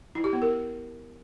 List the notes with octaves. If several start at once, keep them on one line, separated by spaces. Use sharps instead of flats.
E4
G4
B3
A#4